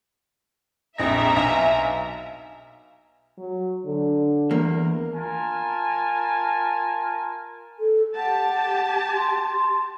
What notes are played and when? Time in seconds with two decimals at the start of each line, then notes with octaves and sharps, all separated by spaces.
0.98 A#1 F2 E5 A#5 A#6
1.36 B1 F5 G#5
3.38 F#3
3.86 D3
4.51 E2 A#3
5.14 F4 A#4 G#5 A5
7.79 A4
8.16 G4 F#5 A5
9.14 C6